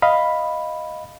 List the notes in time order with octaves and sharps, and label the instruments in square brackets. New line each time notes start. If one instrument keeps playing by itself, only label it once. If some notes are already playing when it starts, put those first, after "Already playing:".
[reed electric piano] D#5 F5 B5